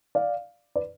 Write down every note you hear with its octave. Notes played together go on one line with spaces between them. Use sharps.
D5 F5
B4 D5